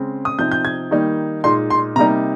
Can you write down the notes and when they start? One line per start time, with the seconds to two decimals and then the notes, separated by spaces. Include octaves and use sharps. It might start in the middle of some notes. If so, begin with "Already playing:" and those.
Already playing: C#3 G#3 C4
0.25 D#6
0.38 C3 F3 C4 D#4 G6
0.52 G6
0.65 G#6
0.91 D#3 G3 A#3 D#4
1.44 A#2 G#3 D#4 C6
1.70 C6
1.96 C3 G3 A#3 D#4 A#5